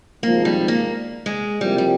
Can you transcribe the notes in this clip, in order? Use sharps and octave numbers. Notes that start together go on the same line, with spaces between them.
G#1 G#2 F3 A#3
G3
A#3
G#3
C3 F3 G3 A#3 E4 G4
G3